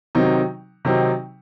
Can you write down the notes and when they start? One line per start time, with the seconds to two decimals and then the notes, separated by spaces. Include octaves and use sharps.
0.15 C3 D#3 F#3 C4 D#4
0.85 C3 D#3 F#3 C4 D#4